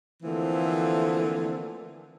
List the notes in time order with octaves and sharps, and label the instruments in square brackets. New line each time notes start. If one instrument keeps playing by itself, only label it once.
[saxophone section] D3 E3 F3 A3 A#3 C4